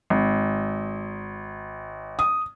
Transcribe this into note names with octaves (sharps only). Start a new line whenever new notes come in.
G#1
D#6